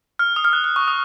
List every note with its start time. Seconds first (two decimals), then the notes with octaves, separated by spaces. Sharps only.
0.19 F6
0.36 D#6
0.45 F6
0.53 F#6
0.64 F6
0.76 C#6
0.88 D#6